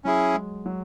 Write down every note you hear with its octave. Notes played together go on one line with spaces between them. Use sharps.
F#3 C#4 E4 G#4
G#3
F#3